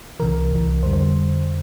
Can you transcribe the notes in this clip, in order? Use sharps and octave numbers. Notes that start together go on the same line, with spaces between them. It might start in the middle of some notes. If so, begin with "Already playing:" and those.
C2 C3 E3 A#4
C2 C3 E3
F2 D3 G3 C5
C5